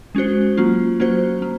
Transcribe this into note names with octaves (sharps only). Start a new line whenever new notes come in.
G#3 C#4 F#4 C5
F#3 A#3 C#4 F4
F#3 A#3 C#4 F#4 C5
A#3